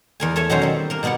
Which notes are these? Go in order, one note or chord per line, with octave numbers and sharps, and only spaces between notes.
E2 A#4 G#5
A4 C#5 E5 G#5
B2 D#3 F#3 C#4 C5 A#5
G3 C4
A#3 A#4
B2 A#3 B3 D5 F#5